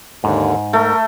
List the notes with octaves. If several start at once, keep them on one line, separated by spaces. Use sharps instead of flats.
D#2 G#2 D3
A3 A#4